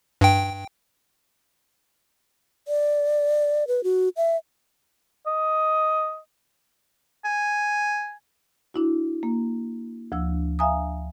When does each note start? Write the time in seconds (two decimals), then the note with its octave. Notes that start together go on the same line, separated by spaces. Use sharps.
0.21 G2 G5
2.68 D5
3.68 B4
3.84 F#4
4.17 E5
5.27 D#5
7.25 G#5
8.74 D4 E4 F#4
9.23 A#3
10.12 D2 F3 D4 E6
10.59 E5 F5 G#5 A#5 D#6